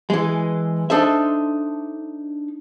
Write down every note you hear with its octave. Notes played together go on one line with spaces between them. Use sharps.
E3 G#3
D4 D#4 A4 C5 E5